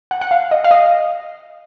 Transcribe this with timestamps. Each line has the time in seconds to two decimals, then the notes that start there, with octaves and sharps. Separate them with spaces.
0.11 F#5
0.21 F#5
0.31 F5
0.51 D#5
0.64 F5
0.71 D#5